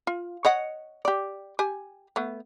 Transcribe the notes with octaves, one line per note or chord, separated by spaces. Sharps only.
F4
C#5 D#5 F#5
G4 D5
G4 G#5
A3 B3